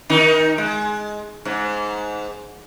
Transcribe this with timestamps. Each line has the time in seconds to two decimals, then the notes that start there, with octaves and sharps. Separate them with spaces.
0.10 D#3 D#4
0.58 G#3
1.45 G#2